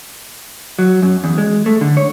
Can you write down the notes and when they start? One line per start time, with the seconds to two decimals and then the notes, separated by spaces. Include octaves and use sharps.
0.79 F#3
1.02 F#2
1.24 E2
1.38 G#3
1.66 A3
1.81 D3
1.97 C#5